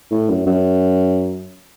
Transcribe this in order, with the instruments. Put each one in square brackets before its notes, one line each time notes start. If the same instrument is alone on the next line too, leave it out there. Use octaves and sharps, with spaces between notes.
[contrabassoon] A2
F#2
F#2